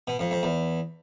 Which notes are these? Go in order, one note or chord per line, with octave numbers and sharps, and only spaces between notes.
B2
F2
F2
E2